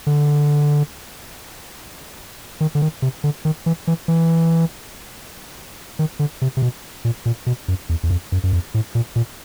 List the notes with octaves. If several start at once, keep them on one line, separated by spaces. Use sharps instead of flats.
D3
D#3
D3
D#3
C3
D3
D#3
E3
E3
E3
D#3
D3
C3
C3
B2
A#2
A#2
B2
F#2
E2
E2
F2
F#2
F#2
F2
A2
A#2
A#2